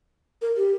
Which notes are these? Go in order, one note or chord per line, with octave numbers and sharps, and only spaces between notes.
A#4
G4